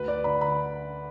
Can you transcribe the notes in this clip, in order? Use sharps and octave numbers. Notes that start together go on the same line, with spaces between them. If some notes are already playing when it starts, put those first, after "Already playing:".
Already playing: D2 B4
D5
D3 B5
B5